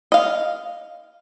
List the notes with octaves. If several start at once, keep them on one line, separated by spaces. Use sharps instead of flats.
D#5 F5